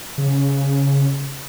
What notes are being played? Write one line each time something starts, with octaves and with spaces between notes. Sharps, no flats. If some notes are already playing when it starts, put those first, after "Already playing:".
C#3